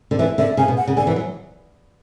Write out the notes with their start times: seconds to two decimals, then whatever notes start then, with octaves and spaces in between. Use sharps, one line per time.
0.11 D3
0.19 E3 E5
0.38 D3 E5
0.57 C#3 G#5
0.68 B2
0.77 F#5
0.88 C#3
0.97 D3 G#5
1.07 E3
1.16 F#3